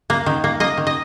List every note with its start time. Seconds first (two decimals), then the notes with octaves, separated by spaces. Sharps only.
0.10 A#3
0.26 D#3
0.44 A#3
0.60 A#3 D#5
0.77 D#3
0.87 D#5